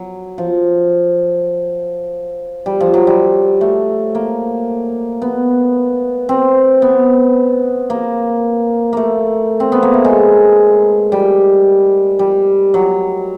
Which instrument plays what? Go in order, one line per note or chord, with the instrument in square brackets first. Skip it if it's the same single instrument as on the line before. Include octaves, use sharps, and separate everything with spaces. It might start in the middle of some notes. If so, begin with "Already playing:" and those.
Already playing: [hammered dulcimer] F#3
F3
G3
F3
F#3
G3
A3
A#3
B3
C4
B3
A#3
A3 A#3
C4
B3
A#3
A3
G#3
G3
G3
F#3